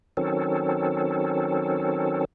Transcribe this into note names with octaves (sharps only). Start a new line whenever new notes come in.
D#3 F#3 C4 C#4 A4